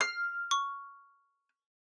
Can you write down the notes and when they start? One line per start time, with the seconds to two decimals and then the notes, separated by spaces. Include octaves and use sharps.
0.01 F6 C7
0.51 C#6